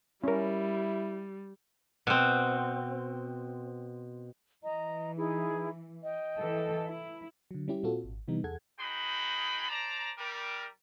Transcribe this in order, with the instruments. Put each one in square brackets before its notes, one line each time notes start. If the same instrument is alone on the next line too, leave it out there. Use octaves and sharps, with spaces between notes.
[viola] G3 [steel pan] C#4 A#4 [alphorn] E4
[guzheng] B2 C4
[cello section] E3 [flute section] D#5 A#5
[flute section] D#4 E4 G#4
D#5 G5
[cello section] E3 A4
E4
[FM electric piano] D3 F#3
G3 C#4 E4 G4
A#2 C4 F4 F#4 A4
G#1
C3 E3 G3 B3 D#4
E2 G#4 A4 F#5 G#6
[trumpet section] D#4 F#4 G#4 G5 B5
C5 D5 A5 A#5
G3 A#4